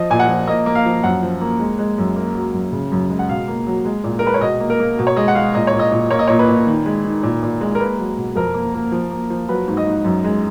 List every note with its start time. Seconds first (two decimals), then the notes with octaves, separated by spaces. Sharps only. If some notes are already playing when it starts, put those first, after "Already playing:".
Already playing: F3 D#5
0.10 A#2 G#5
0.19 F#5
0.28 F3
0.47 A#3 D#5
0.66 A#3
0.75 F5
0.85 F3
1.04 F#2 F#5
1.23 F3
1.41 A#3
1.59 G#3
1.79 G#3
1.98 F#2
2.16 A#3
2.34 F#3
2.53 F#2
2.72 C#3
2.92 F#2
3.10 G#3
3.19 F#5
3.29 B2 F5
3.48 A#3
3.67 F#3
3.85 G#3
4.04 A#2
4.19 A#4
4.23 G#3 B4
4.34 C#5
4.41 B2 D#5
4.60 A#3
4.70 A#4
4.80 A#3
4.99 B2
5.07 C#5
5.17 G#3 D#5
5.28 F#5
5.35 G#3 F5
5.54 A#2 D#5
5.67 C#5
5.74 A#2
5.79 D#5
5.92 A#2
6.11 A#3 C#5
6.19 D#5
6.28 A#2 C#5
6.39 B4
6.48 A#2
6.67 D#3
6.86 G#3
7.05 D#3
7.23 A#2
7.43 A#2
7.61 G#3
7.75 A#4
7.80 A#3 B4
7.98 F#3
8.17 B2
8.36 F2 A#4
8.54 A#3
8.74 A#3
8.92 F3
9.11 A#3
9.30 F3
9.48 F#3 B4
9.68 G#2
9.77 D#5
9.87 G#2
10.05 F#2
10.24 G#3